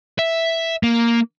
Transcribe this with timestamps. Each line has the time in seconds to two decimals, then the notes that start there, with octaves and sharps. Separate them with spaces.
0.19 E5
0.83 A#3